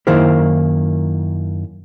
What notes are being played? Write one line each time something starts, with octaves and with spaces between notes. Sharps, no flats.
F#2 D#3 A#3 E4 A#4 C5